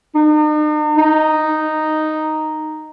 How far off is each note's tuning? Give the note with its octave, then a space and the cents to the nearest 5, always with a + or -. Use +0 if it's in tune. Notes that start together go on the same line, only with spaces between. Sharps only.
D#4 -45
D#4 -5